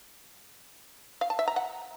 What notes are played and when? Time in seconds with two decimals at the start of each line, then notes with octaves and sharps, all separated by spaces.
1.21 F5
1.30 A5
1.39 E5
1.48 A#5
1.56 F#5